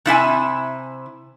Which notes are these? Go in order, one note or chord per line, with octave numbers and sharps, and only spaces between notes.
C3 E4 E5 G#5